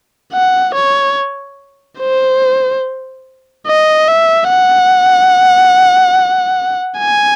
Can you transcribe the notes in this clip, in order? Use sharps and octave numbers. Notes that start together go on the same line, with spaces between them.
F#5
C#5
C5
D#5
E5
F#5
G#5